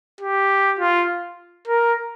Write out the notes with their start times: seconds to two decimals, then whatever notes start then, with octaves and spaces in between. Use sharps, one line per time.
0.21 G4
0.79 F4
1.67 A#4